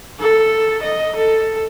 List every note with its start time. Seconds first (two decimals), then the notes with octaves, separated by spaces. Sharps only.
0.20 A4
0.83 D#5
1.16 A4